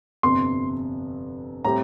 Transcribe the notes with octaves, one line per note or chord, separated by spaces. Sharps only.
G1 F2 C3 C6
A2 G3 C4 G4 A#5